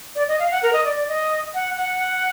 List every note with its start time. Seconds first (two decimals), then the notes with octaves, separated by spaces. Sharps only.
0.16 D5
0.28 D#5
0.40 F5
0.51 F#5
0.63 A#4
0.73 D#5
0.85 D5
0.96 D5
1.09 D#5
1.54 F#5
1.77 F#5